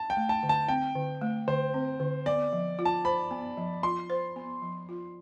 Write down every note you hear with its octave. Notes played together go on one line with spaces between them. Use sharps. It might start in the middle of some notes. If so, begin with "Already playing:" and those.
Already playing: A5
G5
A3
A5
D3
A5
C4 G5
D3
A3
D3 C5
C4
D3
B3 D5
F3
F4
A5
C5 B5
B3
F3
F4 C6
C5
B3
F3
F4